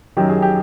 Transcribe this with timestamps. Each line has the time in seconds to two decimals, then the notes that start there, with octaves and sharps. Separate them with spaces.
0.17 F#2 D#3 F#3 G4
0.29 G#4
0.42 G4